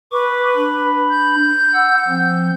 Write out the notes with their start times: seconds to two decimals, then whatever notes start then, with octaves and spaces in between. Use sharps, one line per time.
0.12 B4 C#6 D6
0.56 D4 B5
1.10 G6
1.73 F#5 E6
2.08 F3 C4